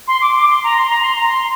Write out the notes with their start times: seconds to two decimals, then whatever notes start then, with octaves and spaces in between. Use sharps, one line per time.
0.08 C6
0.21 D6
0.36 D6
0.50 C6
0.64 A#5
0.77 C6
0.90 A#5
1.02 C6
1.15 A#5
1.28 C6